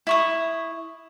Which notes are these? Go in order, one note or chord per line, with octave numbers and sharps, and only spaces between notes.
E4 C#6 D#6